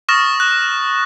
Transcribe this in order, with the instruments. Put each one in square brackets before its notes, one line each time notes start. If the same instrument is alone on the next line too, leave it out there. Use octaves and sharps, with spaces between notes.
[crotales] C#6 D#6 F6 A6 A#6 E7
F#6